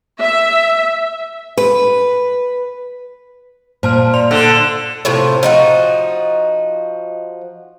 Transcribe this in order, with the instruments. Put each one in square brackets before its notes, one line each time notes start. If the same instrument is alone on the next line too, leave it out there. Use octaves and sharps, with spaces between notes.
[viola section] E5
[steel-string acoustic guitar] B4
[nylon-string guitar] A#2 [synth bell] C5 A5 F6
[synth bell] D5 C6 F7
[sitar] D3
[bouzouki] A2 C3 F3
F3 D#4 F#4